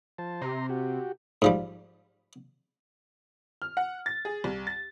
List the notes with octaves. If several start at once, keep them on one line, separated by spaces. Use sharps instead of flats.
F3 C5 A5
C3 A#5 C6
F#4 G4
G#2 F3 G3
F6
F#5
A6
G#4
C2
A6